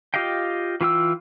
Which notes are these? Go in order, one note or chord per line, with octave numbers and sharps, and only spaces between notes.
F4 G4 D#5 F5 G5
E3 F4 G5 E6